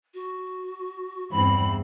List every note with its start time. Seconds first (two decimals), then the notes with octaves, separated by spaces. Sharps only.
0.14 F#4
1.31 E2 G2 C4 B5